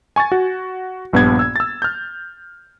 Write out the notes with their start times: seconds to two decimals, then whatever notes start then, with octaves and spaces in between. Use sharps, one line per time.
0.16 G#5 C#6 G#6 A6
0.32 F#4
1.13 A#1 G2 B3 D4 G#6
1.39 E6 G#6
1.56 E6 A6
1.82 F6 G6